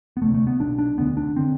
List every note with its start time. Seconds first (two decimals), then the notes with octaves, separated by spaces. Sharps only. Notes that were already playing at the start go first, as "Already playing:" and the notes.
0.17 B3
0.22 E1 D2 C3 A3
0.34 A3
0.47 B3
0.60 B1 B2 D4
0.79 D4
0.97 E1 D2 D3 B3
1.17 D4
1.37 D3 C4